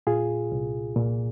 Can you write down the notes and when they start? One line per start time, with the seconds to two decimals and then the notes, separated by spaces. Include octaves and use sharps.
0.07 A#2 F4 G#4
0.52 C2
0.96 A#2